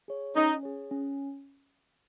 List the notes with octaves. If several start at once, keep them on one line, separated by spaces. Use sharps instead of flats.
G#4 C#5
C#4 D#4
G#4 C#5
C#4